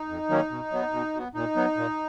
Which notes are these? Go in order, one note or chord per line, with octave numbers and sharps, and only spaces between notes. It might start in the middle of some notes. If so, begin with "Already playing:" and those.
Already playing: D#4
F2
D#3 F#3 A#3 C#4
B2
F#3 B3
B2
F#3 B3
A#2 D#4
F#3 B3
A#2